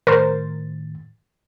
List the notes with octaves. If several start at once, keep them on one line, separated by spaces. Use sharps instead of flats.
A2 D#3 A#4 C5 A6